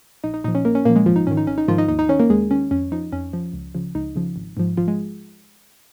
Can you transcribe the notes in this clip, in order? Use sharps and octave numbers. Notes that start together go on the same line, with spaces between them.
A#1 D#4 D#5
D#4 D#5
A#2 F3 D#4 D#5
C#4 C#5
A#1 A#3 A#4
C#4 C#5
A#2 F3 A#3 A#4
G#3 G#4
G#1 F3 F4
D#4
G#2 D#3 C#4
D#4
G#1 C#4
D#4
G#2 D#3 F3 F4
D#4 D#5
D#2 D#4 D#5
D#4 D#5
D#3 C#4 C#5
A#3 A#4
D#2 G#3 G#4
D#3 C#4
F2 C#4
F3 D#4
F2 C#4
F3
C#2
C#3 F3
C#2 D#4
C#3 F3
G#1
G#2 F3
G#1 F3 F4
G#3 G#4